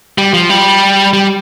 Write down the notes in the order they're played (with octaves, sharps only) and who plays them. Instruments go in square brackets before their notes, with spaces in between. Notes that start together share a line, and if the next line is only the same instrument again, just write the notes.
[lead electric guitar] G3
F3
G3
G3